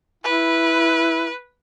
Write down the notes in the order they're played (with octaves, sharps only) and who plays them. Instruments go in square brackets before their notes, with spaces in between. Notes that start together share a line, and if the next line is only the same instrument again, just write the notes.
[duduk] E4 [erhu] B4